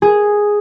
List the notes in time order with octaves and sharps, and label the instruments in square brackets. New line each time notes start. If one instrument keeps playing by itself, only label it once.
[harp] G#4